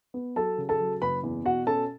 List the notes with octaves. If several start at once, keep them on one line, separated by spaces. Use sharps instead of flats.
B3
F#3 A4 A5
C#3
A4 A5
F#3
F#1 B4 B5
E2
B2 F#4 F#5
C#4 A4 A5